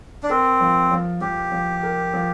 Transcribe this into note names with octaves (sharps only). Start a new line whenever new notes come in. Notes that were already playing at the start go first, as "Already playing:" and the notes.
D4
C4 A#4
F3
F3
F3 G4
F3
A#4
F3